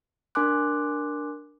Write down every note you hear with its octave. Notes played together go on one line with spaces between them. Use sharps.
D4 A#4 G#5 C6 D6 F#6